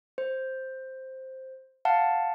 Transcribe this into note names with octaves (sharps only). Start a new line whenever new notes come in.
C5
F5 F#5 A5